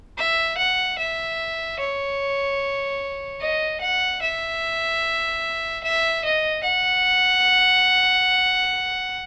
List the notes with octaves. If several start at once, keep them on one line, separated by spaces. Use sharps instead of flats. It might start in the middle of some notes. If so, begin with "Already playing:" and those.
E5
F#5
E5
C#5
D#5
F#5
E5
E5
D#5
F#5